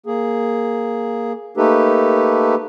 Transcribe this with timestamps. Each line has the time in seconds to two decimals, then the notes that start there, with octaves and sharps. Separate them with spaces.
0.06 A#3 G#4
1.57 A3 A#3 D#4 G4 A4 B4